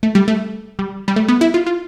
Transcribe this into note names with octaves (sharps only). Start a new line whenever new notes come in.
A3
G3
A3
G3
G3
A3
B3
E4
F4
F4